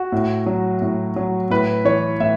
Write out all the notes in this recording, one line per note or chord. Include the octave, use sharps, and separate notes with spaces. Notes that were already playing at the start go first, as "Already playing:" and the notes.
Already playing: F#4
A2
F#3
A2
F#3
A2 B4
E3 C#5
A2 E5